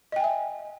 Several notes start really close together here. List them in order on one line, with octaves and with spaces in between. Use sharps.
D#5 G5 G#5 E5